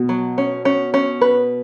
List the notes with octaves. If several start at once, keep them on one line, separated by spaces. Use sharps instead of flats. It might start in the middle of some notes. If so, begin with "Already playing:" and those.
Already playing: B2
F#3
C#4
C#4
C#4
B4